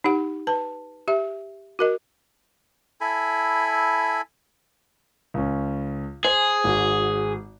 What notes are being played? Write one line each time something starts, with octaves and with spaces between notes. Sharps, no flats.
D#4 G4 F#5
B4 A5
G4 E5
F#4 A#4 D#5
E4 A4 G#5 B5
C#2 C#4
G#4 C5 G#5
G#1 F#4